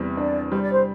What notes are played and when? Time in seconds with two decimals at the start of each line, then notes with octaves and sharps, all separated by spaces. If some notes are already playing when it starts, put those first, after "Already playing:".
Already playing: E2 C3 G3
0.17 D4 D5
0.51 G3 C5
0.62 D5
0.72 C5